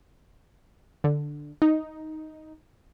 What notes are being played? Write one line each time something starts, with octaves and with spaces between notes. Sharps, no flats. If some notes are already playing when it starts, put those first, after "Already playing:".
D3
D#4